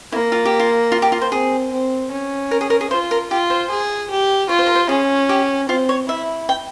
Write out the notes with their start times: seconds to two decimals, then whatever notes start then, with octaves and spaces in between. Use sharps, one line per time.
0.12 A#3 E4
0.32 F4
0.45 G4
0.59 F4
0.92 F4
1.02 G4
1.12 F4
1.21 C5
1.32 C4 G#4
1.72 C4
2.11 C#4
2.51 A#4
2.61 G#4
2.70 A#4
2.81 G#4
2.90 F4 C5
3.11 A#4
3.30 F4 G4
3.50 C5
3.70 G#4
4.10 G4
4.49 F4 C#5
4.59 C5
4.66 A#4
4.75 C5
4.89 C#4 G#4
5.29 G4
5.69 C4 F4
5.89 C#5
6.09 E4 E5
6.49 G5